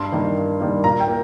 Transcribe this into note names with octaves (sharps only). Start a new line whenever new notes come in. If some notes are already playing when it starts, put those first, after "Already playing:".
Already playing: G2 C6
D#3 G3 A#3
G2
D#3 G3 A#3
A#2 A#5
G5
A#3